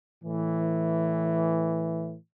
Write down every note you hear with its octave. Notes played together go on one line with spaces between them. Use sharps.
A2 E3